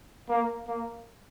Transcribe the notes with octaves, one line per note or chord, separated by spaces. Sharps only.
A#3
A#3